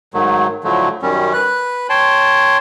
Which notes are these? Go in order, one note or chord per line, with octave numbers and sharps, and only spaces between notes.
G#2 D#3 F#3 A3
A2 D3 F3 F#3 A3
F#2 D#3 G3 C#4
B4 F#6
C#5 G5 A5 C6